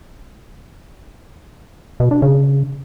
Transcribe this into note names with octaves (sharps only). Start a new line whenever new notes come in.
B2
D4
C#3